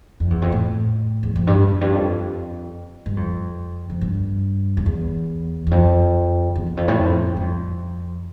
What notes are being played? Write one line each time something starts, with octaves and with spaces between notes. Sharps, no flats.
F2
E2
F2
A2
E2
F2
G2
F2
G2
F2
G2
F2
F2
G2
F2
E2
E2
F2
E2
E2
F2
A2
F2
G2
F2